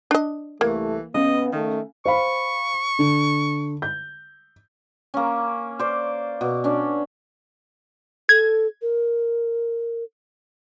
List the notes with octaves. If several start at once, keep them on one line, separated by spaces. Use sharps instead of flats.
D4 D#5
C2 E3 A3 A#3
C#3 B3 D#5
D#3 A3
C5 F5 B5 C#6
D3
G6
A#3 C#4
C5 D5
B2
C#4 D4
A4 G#6
A#4